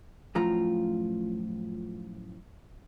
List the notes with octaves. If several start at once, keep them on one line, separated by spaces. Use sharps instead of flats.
F#2 A2 F3 F4 A#5